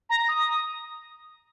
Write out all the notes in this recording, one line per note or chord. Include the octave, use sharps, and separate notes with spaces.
A#5
D#6